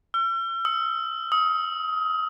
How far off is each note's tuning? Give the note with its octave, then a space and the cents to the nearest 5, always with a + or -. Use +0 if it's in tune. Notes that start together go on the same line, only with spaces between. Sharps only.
E6 +45
E6 -40
D#6 +30